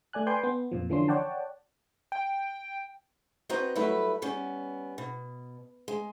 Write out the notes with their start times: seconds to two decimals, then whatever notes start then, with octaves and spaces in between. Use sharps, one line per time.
0.13 A3 D5 G#5 F#6
0.27 B4 D5 G5 G#5 C6 G6
0.43 B3
0.72 F2 A#2 F3
0.90 D3 E3 F3 C#4 D4 C6
1.08 C#5 D5 F#5 G5 A5
2.12 G5
3.49 C4 F#4 B4 D#5 A#5
3.76 F#3 G3 A3 E4 A4 B4
4.22 G3 B3 C#4
4.98 B2
5.88 G#3